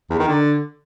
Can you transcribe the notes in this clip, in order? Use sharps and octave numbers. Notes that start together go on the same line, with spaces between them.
E2
D#3
D3